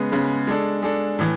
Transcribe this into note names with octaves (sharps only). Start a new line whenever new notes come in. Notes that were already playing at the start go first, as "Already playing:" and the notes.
Already playing: C#3 G#3 B3
C#3 G#3 B3
G#3 D4 A4
G#3 D4 A4
A2 E3